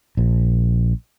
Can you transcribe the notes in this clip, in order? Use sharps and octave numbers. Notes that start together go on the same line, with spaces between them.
A#1